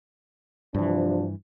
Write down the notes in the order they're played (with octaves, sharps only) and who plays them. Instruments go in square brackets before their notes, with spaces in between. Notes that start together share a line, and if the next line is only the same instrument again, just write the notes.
[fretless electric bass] G2 E3 [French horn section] C3 F3 D4